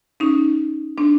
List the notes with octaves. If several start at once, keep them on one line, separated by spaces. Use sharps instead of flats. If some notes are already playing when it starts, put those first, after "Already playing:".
C#4 D#4
C4 D4